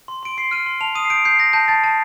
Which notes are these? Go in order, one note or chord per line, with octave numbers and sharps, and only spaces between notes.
C6
C6 D7
C6 C7
F6 D#7
C6
A5 F7
D#6 D#7
C7
G6 D7
G6 C7
G6 A#6
A5 G6
A5 A6
A5